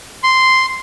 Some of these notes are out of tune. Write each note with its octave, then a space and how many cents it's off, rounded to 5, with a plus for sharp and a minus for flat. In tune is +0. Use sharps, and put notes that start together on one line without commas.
C6 -5